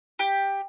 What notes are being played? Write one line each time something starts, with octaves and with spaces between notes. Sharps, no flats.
G4